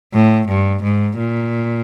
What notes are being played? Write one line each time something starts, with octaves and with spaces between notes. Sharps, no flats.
A2
G2
G#2
A#2